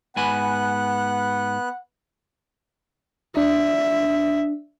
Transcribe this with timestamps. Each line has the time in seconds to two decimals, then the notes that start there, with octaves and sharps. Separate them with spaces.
0.17 G#2 B3 F#5 G#5 B5 F#6
3.37 D4 E5